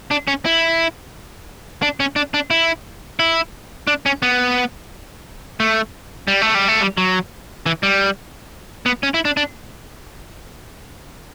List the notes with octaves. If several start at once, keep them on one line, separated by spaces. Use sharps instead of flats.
D4
C#4
E4
D4
C#4
D4
D4
E4
E4
D4
C#4
B3
A3
G3
A3
G3
A3
G3
F#3
E3
G3
B3
C#4
E4
D4
D4